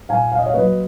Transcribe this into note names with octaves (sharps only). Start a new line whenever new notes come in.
A#2 F5 G#5
F5
D#5
C#5 F5
F#3 A#3 B4 D#5